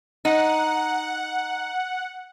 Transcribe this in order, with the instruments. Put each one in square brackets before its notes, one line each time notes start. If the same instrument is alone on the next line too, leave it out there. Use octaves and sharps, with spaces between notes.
[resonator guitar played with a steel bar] D#4 [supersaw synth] F#5